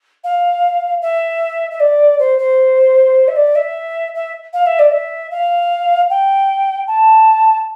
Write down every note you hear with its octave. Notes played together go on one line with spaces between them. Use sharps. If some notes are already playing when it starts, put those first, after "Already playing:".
F5
E5
E5
D5
C5
C5
E5
D5
E5
E5
F5
E5
D5
E5
F5
G5
A5